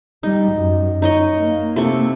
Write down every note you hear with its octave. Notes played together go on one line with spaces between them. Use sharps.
G3 D#4
F#2
D#4 C#5 D#5
A#3
C3 A3 C#6